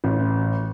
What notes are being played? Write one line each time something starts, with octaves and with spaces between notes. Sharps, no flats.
A1